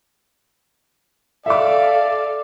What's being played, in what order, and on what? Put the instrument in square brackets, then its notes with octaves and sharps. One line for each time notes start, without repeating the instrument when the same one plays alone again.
[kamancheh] A4 F5 [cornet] D5 [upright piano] E5 D6